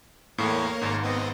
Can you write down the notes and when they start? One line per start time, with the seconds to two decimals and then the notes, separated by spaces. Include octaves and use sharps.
0.38 E2 A2 A#3 A#4 C#5
0.82 G#1 G#2
1.03 B3 C4 D#5